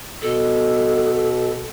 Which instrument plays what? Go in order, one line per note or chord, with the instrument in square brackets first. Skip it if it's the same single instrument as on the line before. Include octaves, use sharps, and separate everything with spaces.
[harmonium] B2 [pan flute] A4